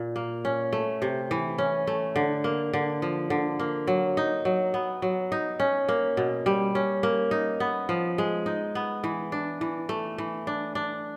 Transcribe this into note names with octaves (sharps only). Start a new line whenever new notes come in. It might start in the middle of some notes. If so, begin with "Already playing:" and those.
Already playing: A#2
A#3
C#4
A3
C3
E3
C#4
A3
D3
A#3
D3
F3
D3
A#3
F#3
D#4
F#3
B3
F#3
D#4
C#4
A#3
B2
G3
C#4
A#3
D#4
B3
F3
G#3
D#4
B3
E3
D4
E3
A3
E3
D4
D4